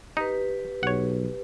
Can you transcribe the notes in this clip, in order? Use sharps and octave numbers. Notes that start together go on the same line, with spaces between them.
D#4 G4 B4
B1 C#5 F#5